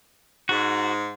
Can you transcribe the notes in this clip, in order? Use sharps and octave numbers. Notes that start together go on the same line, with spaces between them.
G#2 F#4